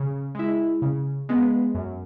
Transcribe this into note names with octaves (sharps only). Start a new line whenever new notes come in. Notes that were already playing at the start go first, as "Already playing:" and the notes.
Already playing: C#3
G#3 E4
C#3
G#3 B3
F#2